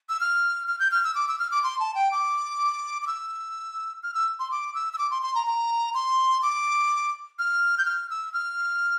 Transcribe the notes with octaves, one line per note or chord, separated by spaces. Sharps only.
E6
F6
F6
G6
F6
E6
D6
E6
F6
D6
C6
A5
G5
D6
D6
E6
F6
E6
C6
D6
E6
E6
D6
C6
C6
A#5
A#5
C6
D6
F6
G6
F6
E6
F6